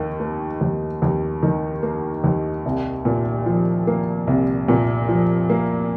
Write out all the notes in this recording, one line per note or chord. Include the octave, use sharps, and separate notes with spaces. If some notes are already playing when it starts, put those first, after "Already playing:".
Already playing: D#2 D#3
A#3
D#2
D#2
D#3
A#3
D#2
C2
A#2
F3
A#3
C2
A#2
F3
A#3